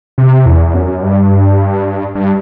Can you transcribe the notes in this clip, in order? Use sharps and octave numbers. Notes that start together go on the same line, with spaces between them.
C3
E2
F#2
G2
G2